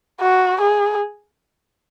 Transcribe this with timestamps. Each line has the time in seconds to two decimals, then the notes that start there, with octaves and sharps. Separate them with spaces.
0.21 F#4
0.61 G#4